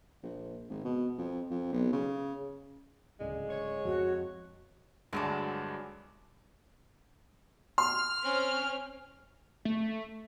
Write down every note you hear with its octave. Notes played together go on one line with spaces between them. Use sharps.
A#1
G#1
B2
F2
F2
B1
C#3
D1 C#3 G#3 D5
C#5
F2 F#4 D#5
D2 G2 D3 F#3 G#3 D4
C6 F6
C4 C#4
A3